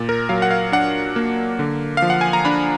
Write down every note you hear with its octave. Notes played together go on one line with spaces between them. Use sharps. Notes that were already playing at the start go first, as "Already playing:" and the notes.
Already playing: A#2
A#4
F#3 F5
F#5
F5
D4 F#5
A#3
D3
F5
F3
F#5
G#5
A#5
D4 B5